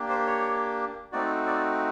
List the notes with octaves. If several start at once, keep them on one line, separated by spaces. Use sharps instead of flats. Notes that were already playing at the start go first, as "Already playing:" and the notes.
Already playing: A#3 D4 G4
C5
C#5
A3 C4 D#4 F#4 D5
D5